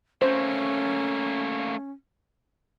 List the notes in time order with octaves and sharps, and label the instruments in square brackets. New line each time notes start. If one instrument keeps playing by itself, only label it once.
[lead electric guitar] A3 A#3 [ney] C#4 [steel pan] C5